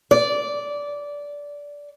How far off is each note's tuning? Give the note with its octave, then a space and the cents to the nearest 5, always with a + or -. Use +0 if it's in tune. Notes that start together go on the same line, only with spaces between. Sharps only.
D5 -15